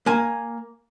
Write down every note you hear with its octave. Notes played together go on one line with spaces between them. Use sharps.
A#3 G#5